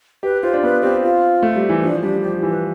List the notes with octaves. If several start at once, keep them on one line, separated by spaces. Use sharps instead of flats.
G4 B4
F4 C5
D4
B3 B4
C4 G4
F4
A3
G3
E3
F3 D4
G3 D4
F3 G4
E3
B4